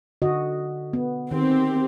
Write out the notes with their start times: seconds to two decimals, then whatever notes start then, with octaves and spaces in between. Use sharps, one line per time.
0.22 D3 F#4 D#5
0.93 B3
1.31 D#3 C4 G4